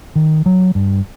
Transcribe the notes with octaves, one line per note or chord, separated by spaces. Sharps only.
D#3
F#3
G2